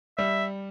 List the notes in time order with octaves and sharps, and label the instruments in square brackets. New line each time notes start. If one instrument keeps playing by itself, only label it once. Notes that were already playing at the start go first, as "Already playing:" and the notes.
[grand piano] G3 [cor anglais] E5